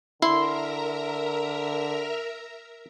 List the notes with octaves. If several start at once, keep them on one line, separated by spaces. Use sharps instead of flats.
D3 E4 A#4 E5 A#5 C6